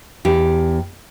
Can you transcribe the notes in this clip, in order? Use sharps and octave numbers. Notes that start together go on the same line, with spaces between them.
E2 G4